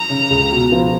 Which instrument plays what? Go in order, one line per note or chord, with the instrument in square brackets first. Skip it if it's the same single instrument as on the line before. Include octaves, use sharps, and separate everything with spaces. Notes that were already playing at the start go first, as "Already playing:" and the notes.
Already playing: [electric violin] A#5
[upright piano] C#3
C#2
B2
F3